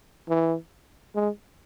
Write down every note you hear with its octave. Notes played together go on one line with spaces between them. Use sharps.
E3
G#3